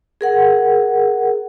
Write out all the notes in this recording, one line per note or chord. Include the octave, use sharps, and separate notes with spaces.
G#4 A#4 F#5